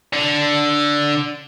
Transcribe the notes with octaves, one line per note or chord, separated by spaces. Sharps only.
D3